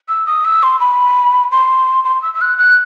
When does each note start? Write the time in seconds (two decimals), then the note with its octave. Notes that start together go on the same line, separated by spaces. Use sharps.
0.08 E6
0.26 D#6
0.45 E6
0.63 C6
0.80 B5
1.52 C6
2.05 C6
2.22 E6
2.34 E6
2.41 F#6
2.58 F#6